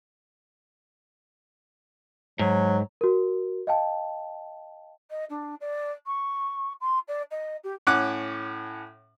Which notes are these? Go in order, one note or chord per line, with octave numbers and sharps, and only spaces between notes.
G#2 F#3
F#4 A#4
D#5 F5 G5 A5
D#5
D4
D5
C#6
C6
D5
D#5
G4
A2 C#4 F#5 D6 F#6